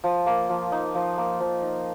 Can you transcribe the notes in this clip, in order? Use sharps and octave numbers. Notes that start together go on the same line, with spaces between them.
F3
A#3
F3
D#4
F3
A#3
F3
D#4